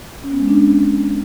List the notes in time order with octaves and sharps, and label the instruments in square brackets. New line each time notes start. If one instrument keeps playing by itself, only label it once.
[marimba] C#4
B3
G#3
D4
C#4